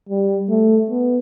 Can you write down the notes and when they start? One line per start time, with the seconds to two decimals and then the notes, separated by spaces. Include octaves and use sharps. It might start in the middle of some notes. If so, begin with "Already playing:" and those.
0.09 G3
0.50 A3
0.90 B3